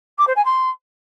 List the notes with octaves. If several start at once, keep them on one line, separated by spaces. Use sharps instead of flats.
D6
C5
G#5
C6